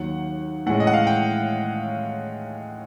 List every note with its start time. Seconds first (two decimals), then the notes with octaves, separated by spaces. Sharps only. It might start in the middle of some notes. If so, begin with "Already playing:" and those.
Already playing: D#2 D#3 F#3 F#5
0.66 A2 E3 G#3 C#4 F#5
0.80 D#5
0.87 F#5
0.94 F5
1.07 G5